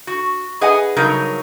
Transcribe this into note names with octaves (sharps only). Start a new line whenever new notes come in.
F#4
G#4 B4 D#5 F#5 G#5
G2 C#3 F#3 D#4 A#4